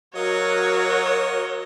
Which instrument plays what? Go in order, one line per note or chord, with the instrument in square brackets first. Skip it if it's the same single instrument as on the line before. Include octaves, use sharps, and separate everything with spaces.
[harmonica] F#3 D#5 F5 [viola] F#4 [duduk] A#4 [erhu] C#5